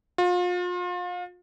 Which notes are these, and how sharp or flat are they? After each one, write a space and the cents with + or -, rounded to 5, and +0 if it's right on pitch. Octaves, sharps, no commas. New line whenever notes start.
F4 +35